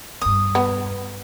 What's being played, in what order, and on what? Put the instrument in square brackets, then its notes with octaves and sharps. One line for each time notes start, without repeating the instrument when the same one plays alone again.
[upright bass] E1 G2 [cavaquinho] D#6
[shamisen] B3